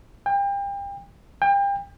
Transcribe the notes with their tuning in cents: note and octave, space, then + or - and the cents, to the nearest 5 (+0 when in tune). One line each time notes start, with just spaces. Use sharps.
G5 +30
G5 +30